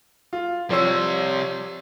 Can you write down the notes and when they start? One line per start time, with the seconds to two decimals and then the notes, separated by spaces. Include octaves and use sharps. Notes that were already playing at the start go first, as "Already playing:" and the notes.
0.33 F4
0.70 C3 F3 G3 C#5 E6